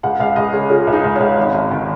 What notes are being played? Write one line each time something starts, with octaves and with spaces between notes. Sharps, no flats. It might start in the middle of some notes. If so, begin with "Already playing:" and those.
C#2 F#5
C#2 F5
C#2 D#5
C#3 C#5
C#3 F4
C#2
D#4
C#2
C#2 C#4
G#1
G#1
D#3